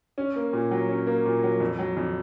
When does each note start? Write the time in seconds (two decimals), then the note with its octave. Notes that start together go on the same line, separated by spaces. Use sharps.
0.18 C#4
0.36 A#3
0.53 A#2
0.71 F#3
0.89 C#4
1.07 A#3
1.26 A#2
1.43 F#3
1.60 F2
1.79 F#3
1.97 F2